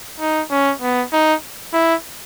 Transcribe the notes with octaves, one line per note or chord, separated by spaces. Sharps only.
D#4
C#4
B3
D#4
E4